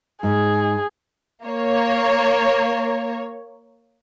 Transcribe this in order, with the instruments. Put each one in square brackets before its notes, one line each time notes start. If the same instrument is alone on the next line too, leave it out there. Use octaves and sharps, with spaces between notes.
[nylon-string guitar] G#2 [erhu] G#4
[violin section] A#3 C#5